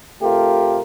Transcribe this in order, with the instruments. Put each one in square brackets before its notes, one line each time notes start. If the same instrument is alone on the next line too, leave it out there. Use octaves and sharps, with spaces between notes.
[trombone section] C3 A3 F4 G4 A4 A#4